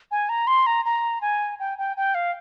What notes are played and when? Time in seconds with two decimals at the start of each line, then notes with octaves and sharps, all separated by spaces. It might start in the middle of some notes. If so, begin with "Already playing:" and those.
0.11 G#5
0.29 A#5
0.47 C6
0.67 A#5
0.85 A#5
1.21 G#5
1.60 G5
1.78 G5
1.97 G5
2.15 F5